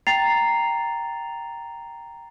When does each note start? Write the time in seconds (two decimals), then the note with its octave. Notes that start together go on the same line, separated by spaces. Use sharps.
0.07 G5 A#5 A6 C7 F7